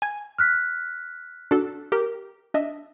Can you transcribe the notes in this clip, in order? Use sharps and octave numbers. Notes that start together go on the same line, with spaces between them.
G#5 G#6
F6 F#6 B6
D4 F#4 A4
G4 A#4
D4 D#5 E5